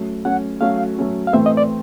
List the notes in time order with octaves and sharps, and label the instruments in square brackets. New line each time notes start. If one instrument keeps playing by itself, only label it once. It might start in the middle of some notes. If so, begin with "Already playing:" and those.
Already playing: [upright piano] F#3 A3 C#4
[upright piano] F#3 A3 C#4 [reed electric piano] F#5
[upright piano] F#3 A3 C#4 F#4 [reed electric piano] F5
[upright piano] F#3 A3 C#4 F#4
[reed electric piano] F5
[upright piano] A2 E3 A3 C4 [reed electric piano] E5
[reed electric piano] D#5
D5